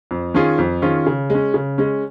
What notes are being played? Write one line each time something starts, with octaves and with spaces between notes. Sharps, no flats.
F2
D#3 C#4 F4 G#4
F2
D#3 C#4 F4 G#4
C#3
G#3 C#4
C#3
G#3 C#4